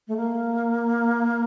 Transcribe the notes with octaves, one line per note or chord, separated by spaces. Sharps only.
A3
A#3